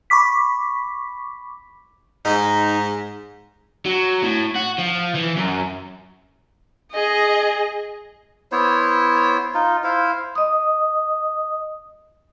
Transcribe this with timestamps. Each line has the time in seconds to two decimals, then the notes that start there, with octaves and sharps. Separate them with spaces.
0.10 B5 C#6 D6 B6
2.25 G#2 D#4
3.86 F#3
4.23 A2
4.55 F#4
4.78 F3
5.15 E3
5.36 F#2
6.92 G#4 D#5
8.52 B3 E4 C5 C#5
9.54 D#4 F4
9.84 E4 C5 F5
10.35 D#5 D#6